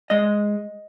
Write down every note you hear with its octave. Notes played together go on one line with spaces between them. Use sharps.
G#3 D#5